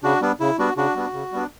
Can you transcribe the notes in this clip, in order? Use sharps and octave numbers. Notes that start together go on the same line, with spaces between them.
C#3 D4 F#4
G3 B3 D4
C#3 E4
G3 B3 D4 F#4
C#3 D4 F#4
G3 B3 D4
C#3
G3 B3 D4